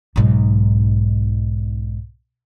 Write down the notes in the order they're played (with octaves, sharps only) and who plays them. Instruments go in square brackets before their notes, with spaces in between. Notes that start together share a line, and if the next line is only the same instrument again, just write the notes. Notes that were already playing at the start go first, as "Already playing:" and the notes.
[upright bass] B1 G#2